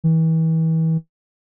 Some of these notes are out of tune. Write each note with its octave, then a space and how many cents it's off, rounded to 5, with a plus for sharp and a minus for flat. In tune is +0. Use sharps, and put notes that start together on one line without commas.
E3 -35